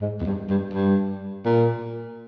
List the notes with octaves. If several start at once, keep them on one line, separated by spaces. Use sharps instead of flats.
G#2
E2
G2
G2
G2
A#2